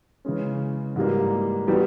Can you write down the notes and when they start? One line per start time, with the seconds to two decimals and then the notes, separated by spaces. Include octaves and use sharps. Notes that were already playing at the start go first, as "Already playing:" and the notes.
0.25 C#3 E3 G#3 C#4
0.96 G#2 E3 G3 A#3
1.67 E3 G3 B3 G4